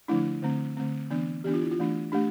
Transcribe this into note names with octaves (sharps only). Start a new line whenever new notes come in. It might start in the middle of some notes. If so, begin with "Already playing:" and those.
D3 F3 A3 D4 E4
D3 A3 C4
D3 A3 C4
E3 B3 D4
E3 B3 D4 G4
F4
E4
F4
E3 A3 D4
A3 D4 G4